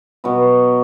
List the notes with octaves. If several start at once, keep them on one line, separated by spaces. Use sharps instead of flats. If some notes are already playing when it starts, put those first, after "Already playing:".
B2 F#3 B3